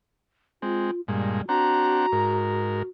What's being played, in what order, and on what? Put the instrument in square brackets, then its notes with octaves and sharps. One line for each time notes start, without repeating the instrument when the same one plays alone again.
[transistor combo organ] G#3 C4 [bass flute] F4
[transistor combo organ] G2 A#2 G#3 [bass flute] G3
[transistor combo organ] C4 D4 F#5 [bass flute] F#4 [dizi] A#5
[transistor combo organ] G#2 A#4